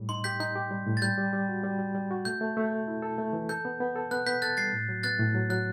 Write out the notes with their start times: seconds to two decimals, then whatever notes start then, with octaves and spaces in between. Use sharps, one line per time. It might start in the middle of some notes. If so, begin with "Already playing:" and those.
Already playing: A2 G3
0.09 D#4 C6
0.24 G4 G6 B6
0.40 D#4 G6
0.56 G4
0.71 G3
0.86 A2
0.97 A6
1.02 G3 G6
1.18 G3
1.33 G3
1.49 F#4
1.64 G3
1.79 G3
1.94 G3
2.11 F#4
2.25 A3 G6
2.41 A3
2.57 A3
2.71 A4
2.88 E4
3.02 A4
3.18 A3
3.33 E3
3.49 A4 G6
3.65 B3
3.80 B3
3.96 A4
4.11 B3 F#6
4.27 B3 G6 B6
4.42 A4 F#6 A6
4.57 G3 A6 C7
4.73 A2
4.89 F#3
5.03 B3 F#6 A6
5.19 A2
5.34 F#3
5.50 F#3 F#6